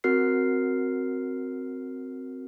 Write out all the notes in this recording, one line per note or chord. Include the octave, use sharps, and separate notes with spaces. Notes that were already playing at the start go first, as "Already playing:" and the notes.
C4 F#4 A#4 F6 C7